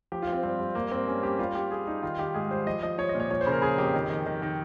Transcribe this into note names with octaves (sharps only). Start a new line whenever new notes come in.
F3 G4
F4
F3
C4
G2 C4
G2
G2 A#3
G2 C4
G2 C#4
G3 G4
G3 F4
G3 G4
G3 G#4
G3 D#4
D#3 F4
D#3 G4
G#2 G#4
G3 C5
F3 D#5
F3 D#5
F3 C#5
D#5
A#2
C#5
F3 C#5
C5
C#3 A#4
C#3 G#4
F2 G4
D#3
D#3
D#3
D#3